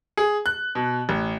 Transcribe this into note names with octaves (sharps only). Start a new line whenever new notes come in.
G#4
F#6
B2
A1